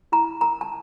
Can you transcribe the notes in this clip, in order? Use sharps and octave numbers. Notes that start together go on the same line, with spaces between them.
E4 A#5
A#4 A#5
A5